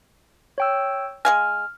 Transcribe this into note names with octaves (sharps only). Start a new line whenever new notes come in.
C#5 G5 E6
G#3 F5 G#5 F6